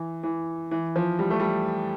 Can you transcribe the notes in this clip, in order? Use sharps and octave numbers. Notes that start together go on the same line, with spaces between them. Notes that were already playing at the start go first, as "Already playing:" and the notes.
Already playing: E3
E3
E3
F3
G3
A3
G3